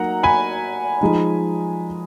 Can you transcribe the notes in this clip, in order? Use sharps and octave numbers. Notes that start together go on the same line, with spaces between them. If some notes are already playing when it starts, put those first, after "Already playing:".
Already playing: F#3 A#3 D#4 F#5 A#5
G#5 B5
F3 G#3 D#4